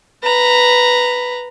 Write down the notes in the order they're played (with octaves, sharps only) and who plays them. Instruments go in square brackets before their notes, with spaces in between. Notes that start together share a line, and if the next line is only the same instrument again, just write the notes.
[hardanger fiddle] B4 A#5